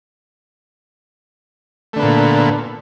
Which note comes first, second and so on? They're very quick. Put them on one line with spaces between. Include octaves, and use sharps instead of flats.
A3 D3 B3 A#2